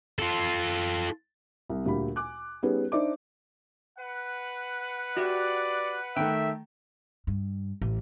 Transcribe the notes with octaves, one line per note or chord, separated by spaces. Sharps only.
F4 A4
C2
D2 A#2 G3 A#3 B5
G#5 D6 F#6
G3 B3 C#4 D#4 G#4 B4
D4 D#4 C5 D5 E5 D6
B4 F#5
F#4 G4 D5 E5
D#3 A3 E5 G5
G2
A1